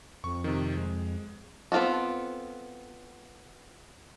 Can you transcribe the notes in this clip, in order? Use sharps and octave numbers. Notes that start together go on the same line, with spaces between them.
F2 C#6
C3 D#3
G#3
B3 C4 F4 F#4 A4